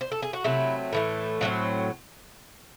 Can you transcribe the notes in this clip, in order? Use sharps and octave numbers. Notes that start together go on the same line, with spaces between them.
C5
A4
G#4
F#4
C3 F#3 A3 E4
A2 E3 A3
A2 F#3 A3 C4 F#4